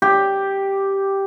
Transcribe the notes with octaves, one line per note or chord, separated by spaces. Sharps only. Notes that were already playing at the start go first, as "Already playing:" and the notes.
G4